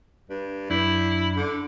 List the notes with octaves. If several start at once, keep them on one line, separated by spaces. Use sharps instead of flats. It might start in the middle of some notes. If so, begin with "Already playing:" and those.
G2
F#2 D4 E4
D3